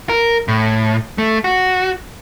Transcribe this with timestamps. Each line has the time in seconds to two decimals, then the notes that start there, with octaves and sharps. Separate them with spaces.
0.09 A#4
0.48 A2
1.18 A3
1.44 F#4